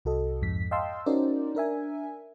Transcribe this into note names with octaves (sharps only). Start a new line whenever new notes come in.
C2 F#4 A4 D#5
F2 G#2 B6
D#5 F5 G5 A5 C6 E6
C#4 D#4 F#4 A#4 C5 D5
D4 A#4 E5 G#5